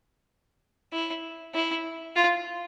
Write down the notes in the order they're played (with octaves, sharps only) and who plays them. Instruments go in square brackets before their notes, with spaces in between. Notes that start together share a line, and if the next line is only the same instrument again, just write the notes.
[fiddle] E4
E4
F4